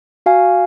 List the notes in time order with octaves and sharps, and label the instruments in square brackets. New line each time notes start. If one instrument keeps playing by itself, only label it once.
[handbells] F#4 F5 G#5